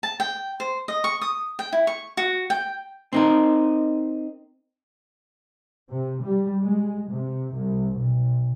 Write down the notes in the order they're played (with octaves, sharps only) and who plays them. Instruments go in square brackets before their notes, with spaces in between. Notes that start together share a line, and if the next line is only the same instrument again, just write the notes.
[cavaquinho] A5
G5
C5
D#5
C#6
D#6
G5
E4
C#6
F#4
G5
[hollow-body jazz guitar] C4 D#4 A#4
[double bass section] C3
G3
G#3
C3
C2
B1